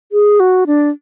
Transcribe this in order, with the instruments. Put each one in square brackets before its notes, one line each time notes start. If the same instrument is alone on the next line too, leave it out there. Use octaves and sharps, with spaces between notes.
[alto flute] G#4
F#4
D4